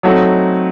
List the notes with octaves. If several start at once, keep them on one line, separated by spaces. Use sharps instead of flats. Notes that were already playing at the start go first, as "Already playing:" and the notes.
F#3 A3 C4 D#4 F#4